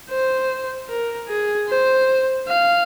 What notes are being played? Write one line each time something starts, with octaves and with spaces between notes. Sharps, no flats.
C5
A#4
G#4
C5
F5